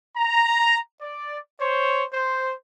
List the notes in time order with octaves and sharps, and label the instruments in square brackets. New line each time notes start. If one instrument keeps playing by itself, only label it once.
[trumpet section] A#5
D5
C5 C#5
C5